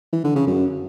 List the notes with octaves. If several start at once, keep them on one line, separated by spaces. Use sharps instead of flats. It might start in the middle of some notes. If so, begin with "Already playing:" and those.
E3
D3
C#3
F#2